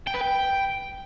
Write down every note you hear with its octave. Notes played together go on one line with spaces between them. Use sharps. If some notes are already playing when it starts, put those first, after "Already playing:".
G5
B4
G5